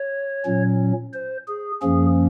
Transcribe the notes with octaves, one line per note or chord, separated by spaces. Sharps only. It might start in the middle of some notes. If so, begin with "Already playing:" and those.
Already playing: C#5
A#2 F#3 C#4
C5
G#4
F#2 F3 A#3 C#4 G#4